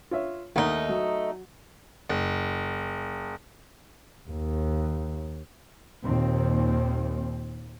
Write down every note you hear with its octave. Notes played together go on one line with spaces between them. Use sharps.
F4 C#5 E5
D#2 A3 D#4 A#4 F#5
F#3
F#1
D#2
D#2 A#2 C4